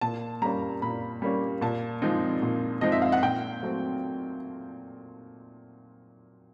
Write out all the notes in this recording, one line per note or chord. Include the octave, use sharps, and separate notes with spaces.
A#2 A5
G3 A#3 C#4 A#5
A#2 B5
G3 A#3 C#4
A#2 A5
F3 G#3 C4 D#4
A#2
F3 G#3 C4 D#4 D#5
E5
F5
F#5
A#2 G5
F#3 A3 C4